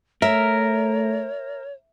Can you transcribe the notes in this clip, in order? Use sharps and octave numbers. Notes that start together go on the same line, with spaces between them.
A3 A#4 C#5 E5